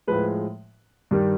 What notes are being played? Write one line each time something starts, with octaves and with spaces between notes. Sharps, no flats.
A2 F3 G#3 B4
G2 D#3 G3